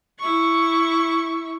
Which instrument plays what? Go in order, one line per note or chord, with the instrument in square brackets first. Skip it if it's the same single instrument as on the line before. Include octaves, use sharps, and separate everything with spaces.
[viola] E4 C#6